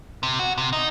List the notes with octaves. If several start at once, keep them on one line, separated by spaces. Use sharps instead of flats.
C3
F#4
C3
D#4